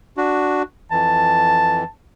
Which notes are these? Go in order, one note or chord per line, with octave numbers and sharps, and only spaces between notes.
D4 F#4
F2 E3 A5